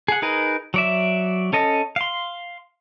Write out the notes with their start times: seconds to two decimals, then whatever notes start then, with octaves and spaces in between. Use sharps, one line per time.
0.08 G#4 F#5
0.22 D#4 G#4 A#4 B4
0.74 F#3 D5 E5
1.53 C#4 A4 D#5
1.96 F5 C6